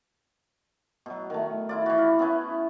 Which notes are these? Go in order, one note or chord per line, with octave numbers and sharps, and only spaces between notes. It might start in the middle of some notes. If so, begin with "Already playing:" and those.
B2 F#3
D#3 A3
E4 F4 D5
E3 F#4
F5
B3 C#4 E4 B4